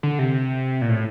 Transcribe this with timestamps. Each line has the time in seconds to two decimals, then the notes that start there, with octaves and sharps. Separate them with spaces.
0.03 D3
0.19 C3
0.82 A#2
0.90 A2